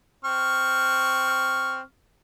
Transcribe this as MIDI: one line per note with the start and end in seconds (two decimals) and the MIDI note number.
0.25 1.81 60
0.25 1.81 85
0.25 1.81 89